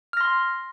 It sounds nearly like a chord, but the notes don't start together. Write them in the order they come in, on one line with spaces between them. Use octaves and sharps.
F6 A#6 C6